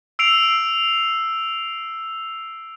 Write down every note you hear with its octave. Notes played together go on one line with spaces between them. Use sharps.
E6 C7 D7 F7